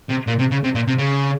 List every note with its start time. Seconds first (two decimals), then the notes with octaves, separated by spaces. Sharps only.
0.10 C3
0.28 A#2
0.39 C3
0.52 C#3
0.64 C3
0.75 A#2
0.87 C3
0.98 C#3